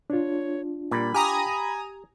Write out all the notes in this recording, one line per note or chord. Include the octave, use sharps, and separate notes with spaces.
D4 F4 C#5
A#2 G3 B5
G4 F5 G#5 A#5 D#6